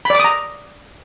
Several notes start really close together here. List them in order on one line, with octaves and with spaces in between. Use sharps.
B5 D5 D6 D#6 A#5